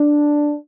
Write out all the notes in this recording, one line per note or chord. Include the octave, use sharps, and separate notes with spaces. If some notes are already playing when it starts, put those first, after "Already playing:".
Already playing: D4